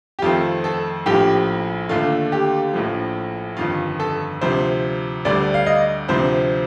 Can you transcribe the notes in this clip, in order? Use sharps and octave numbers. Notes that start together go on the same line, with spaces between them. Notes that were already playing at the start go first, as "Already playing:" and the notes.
G4
F2 D#3 A3 C4 F4
A4
A#1 A2 F3 G4
D#2 D3 A3 F4
G4
A#1 A2 F3
G1 F2 D#3 F4
A4
D2 C3 F3 C5
D2 D3 G3 D5
F5
D#5
D2 C3 F3 C4 C5